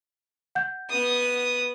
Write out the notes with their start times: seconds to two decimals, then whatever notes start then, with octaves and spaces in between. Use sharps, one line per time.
0.55 F#5 G6
0.90 B3 D#6